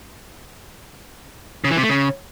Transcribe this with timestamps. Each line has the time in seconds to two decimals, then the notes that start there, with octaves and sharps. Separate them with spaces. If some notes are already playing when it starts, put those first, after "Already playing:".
1.64 C#3
1.71 E3
1.77 C3
1.83 A3
1.89 C#3